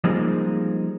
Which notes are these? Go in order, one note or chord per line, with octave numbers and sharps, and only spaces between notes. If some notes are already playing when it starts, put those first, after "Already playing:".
F3 G3 G#3 A#3 C4 D#4